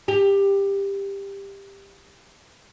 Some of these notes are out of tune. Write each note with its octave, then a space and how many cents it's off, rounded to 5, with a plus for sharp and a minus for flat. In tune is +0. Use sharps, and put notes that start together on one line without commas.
G4 +15